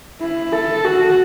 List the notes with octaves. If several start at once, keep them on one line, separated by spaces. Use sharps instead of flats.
E4
A4
F#4